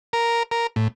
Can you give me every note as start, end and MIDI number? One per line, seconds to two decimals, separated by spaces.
0.13 0.43 70
0.51 0.67 70
0.76 0.88 45